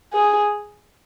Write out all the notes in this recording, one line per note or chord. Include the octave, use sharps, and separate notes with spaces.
G#4